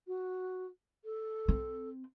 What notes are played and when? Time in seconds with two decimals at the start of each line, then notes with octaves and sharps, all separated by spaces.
0.07 F#4
1.04 A4
1.48 C4